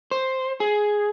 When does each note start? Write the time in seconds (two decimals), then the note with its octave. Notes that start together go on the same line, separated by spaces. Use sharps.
0.11 C5
0.60 G#4